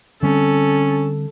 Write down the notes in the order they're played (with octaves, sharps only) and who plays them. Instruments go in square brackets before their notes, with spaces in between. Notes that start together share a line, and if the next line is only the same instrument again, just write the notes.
[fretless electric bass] D3 G3 C4 [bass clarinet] C#4 [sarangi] A4